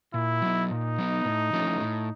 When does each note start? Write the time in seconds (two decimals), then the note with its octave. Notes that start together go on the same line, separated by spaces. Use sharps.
0.14 A#2 E4
0.42 F#3 B3
0.70 A#2 D#4
0.98 F#3 B3
1.25 A2
1.53 F3 A3 C#4 E4
1.81 A2